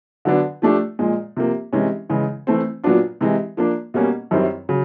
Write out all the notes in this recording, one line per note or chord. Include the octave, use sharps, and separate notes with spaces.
D3 F#3 B3 D4
F3 A3 D4 G4
A#2 F3 G#3
C3 F3 A#3
C3 E3 G#3 C#4
C#3 E3 G#3
E3 A3 C4
A#2 F#3 B3 D4 F4
C3 E3 G#3
F3 A#3 D4
B2 G3 A#3 C#4
F#2 D#3 G3 C4 E4
C#3 F#3